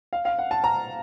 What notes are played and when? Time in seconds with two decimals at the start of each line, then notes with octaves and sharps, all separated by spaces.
0.13 F5
0.25 F5
0.39 F#5
0.51 A5
0.64 A#5